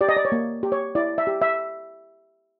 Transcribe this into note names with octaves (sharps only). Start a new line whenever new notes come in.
G4 D5
D#5
D5
C#5
A#3
G4
C#5
E4 D5
E5
G4
E5